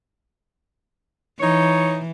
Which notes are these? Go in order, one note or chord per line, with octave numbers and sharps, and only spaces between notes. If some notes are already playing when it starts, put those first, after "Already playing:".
E3 D#4 C#5